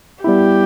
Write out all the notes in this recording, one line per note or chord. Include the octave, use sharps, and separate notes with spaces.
G3 B3 E4 G4